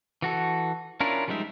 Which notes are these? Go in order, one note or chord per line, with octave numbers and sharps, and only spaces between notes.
E3 F#4 A4
C#4 D4 E4 F4 A#4
F3 G3 G#3 D#4 E5